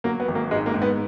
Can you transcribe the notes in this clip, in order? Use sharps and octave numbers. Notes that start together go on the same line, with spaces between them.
F#3 A#3
B3
G#1
A#3
G#2 G#3
A#3
G#2
B3